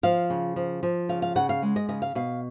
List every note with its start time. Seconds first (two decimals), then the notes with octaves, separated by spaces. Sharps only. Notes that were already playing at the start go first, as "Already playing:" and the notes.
0.03 F3 F5
0.30 C#3
0.56 F3
0.83 F3
1.09 C#3 F5
1.22 F5
1.36 C#3 F#5
1.49 F5
1.62 G#3
1.76 D#5
1.89 C#3 D#5
2.02 F5
2.15 B2 F5